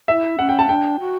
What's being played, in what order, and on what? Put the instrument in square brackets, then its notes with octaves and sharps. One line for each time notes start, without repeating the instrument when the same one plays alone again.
[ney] E4 [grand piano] E5
[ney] C#4 [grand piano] F#5
[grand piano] G5
A5
[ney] D4 [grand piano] G5
[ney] F#4